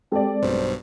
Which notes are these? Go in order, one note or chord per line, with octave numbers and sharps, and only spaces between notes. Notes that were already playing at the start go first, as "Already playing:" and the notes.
G#3 C4 G4 A4 D5
B1 G2 B2 C5